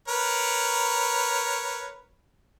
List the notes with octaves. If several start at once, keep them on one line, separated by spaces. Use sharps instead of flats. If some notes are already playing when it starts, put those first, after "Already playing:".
A#4 B4 C#5